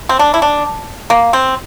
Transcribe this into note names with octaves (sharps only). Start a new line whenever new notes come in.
C4
D4
E4
D4
A#3
C4